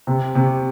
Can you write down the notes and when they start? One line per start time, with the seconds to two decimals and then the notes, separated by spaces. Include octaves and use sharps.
0.07 C3
0.35 C3